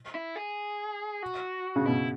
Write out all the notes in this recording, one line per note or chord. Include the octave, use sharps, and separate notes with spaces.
E4
G#4
F#4
C#3
B2 E4